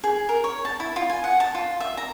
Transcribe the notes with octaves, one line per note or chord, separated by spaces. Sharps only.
G#4
A#4
C#5
A5
E4
F4
G#5
F#5
A5
F4
E5
A#5